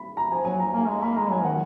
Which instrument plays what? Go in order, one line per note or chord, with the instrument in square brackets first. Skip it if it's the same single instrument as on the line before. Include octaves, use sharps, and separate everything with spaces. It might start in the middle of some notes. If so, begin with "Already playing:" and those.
Already playing: [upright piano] B5
A#5
[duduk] F3 [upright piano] G#5
[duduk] F#3 [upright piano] G#5
[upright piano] A#5
[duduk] A#3 [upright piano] G#5
[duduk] G#3 [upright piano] A#5
[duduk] A#3 [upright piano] B5
[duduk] G#3 [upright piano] A#5
[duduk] F#3 [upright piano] G#5
[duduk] D#3 [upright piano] F#5